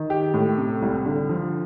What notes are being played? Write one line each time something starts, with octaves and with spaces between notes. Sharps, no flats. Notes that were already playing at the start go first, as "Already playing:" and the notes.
Already playing: D#3
G4
A2
C3
C2
D3
F3